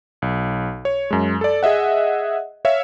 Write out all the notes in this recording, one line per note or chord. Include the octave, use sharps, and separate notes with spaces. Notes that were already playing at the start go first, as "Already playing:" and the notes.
B1
C#5
F#2 G#3
A4 D5
G#4 D#5 E5 F#5
C#5 E5 F5